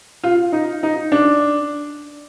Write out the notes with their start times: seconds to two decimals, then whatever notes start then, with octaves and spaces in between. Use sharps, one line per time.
0.24 F4
0.52 D#4
0.83 D#4
1.12 D4